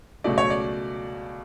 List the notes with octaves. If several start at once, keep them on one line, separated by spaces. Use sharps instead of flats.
C#2 B2 F#3 A3 D5
C#5
D5